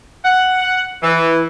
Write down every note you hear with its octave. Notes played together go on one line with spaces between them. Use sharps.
F#5
E3